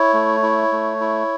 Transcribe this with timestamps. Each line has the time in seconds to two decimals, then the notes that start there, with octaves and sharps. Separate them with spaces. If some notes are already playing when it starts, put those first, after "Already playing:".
Already playing: E4 C#5
0.13 A3
0.43 E4
0.72 A3
1.01 E4